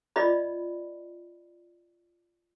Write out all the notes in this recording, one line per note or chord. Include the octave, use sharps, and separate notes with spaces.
F4 D5 D#5 B5